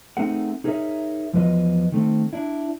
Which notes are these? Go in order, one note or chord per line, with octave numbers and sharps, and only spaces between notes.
A3 C4 D#4 G#4 A#4 F#5
D#4 G#4 A#4 C5 C#5 E5
E2 F3 F#3 F4 B4 D#5
D#3 A3 C4
D4 E4